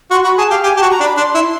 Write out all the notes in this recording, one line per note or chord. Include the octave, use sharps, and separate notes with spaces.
F#4 C6
F#4 B5
G#4 A5
G4 F5
G4 G#5
G4 A5
F#4
A#5
D4
B5
D4 C6
E4